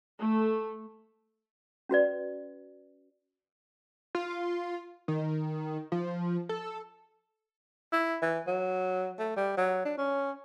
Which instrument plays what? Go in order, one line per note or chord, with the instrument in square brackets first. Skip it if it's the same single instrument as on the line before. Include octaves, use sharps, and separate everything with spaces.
[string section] A3
[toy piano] C#4 F#4 B4 D5
[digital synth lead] F4
D#3
F3
A4
[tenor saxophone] E4
E3
F#3
A3
G3
F#3
D4
C#4